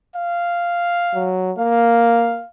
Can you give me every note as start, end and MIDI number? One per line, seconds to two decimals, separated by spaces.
0.16 1.33 77
1.14 1.52 54
1.58 2.41 58
1.58 2.48 77